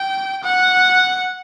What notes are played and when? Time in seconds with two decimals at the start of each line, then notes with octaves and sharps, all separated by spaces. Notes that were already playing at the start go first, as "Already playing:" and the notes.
Already playing: G5
0.43 F#5